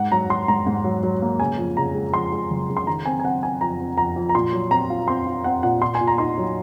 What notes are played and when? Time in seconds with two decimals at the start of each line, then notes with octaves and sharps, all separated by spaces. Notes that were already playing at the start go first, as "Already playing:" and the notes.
Already playing: G#2 F#5
0.11 F#3 A#5
0.30 F#3 C6
0.48 G#2 A#5
0.67 G#2
0.84 F#3
1.03 F#3
1.22 A#3
1.40 C#3 G#5
1.58 F2
1.77 C#3 A#5
1.95 G#3
2.14 F2 C6
2.32 G#3
2.51 F#1
2.70 C#3
2.77 C6
2.87 D#3 A#5
3.06 C4 G#5
3.20 G#5
3.24 C4 F#5
3.43 C4 G#5
3.61 F2 A#5
3.80 C4
3.97 F2 A#5
4.16 F2
4.29 A#5
4.35 A#2 C6
4.53 F#3
4.71 C4 A#5
4.90 F4
5.08 C4 C6
5.26 F4
5.44 C4 F#5
5.63 A#2 F#5
5.82 A#2 C6
5.95 G#5
6.01 A#2
6.07 A#5
6.18 D#4 C6
6.38 F#3